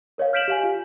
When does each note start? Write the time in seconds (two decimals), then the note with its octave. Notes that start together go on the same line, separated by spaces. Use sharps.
0.18 A#4 C#5 D#5 F5
0.33 F6 G6 B6 D7 E7 F#7
0.48 G4 F5 G#5
0.64 F4